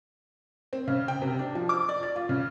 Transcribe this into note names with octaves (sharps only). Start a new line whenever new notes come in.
C4
C#3
G5
C3
D4
F3
D6
D5
A6
F4
C#3